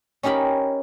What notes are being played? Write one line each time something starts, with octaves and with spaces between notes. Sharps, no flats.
C#4 D#4 G4 A#4 B5